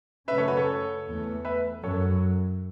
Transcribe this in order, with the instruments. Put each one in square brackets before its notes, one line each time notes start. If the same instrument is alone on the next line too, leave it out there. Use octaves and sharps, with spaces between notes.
[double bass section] F#2 C#3 A3 C#4 [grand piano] B4 E5
[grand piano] A4 C#5
F#4 B4
A4 C#5
[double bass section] E2 E3 A3
[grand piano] B4 E5
[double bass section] F#2 F#3 [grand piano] A4 C#5